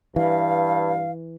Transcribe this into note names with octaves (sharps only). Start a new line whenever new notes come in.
G2 E3 F5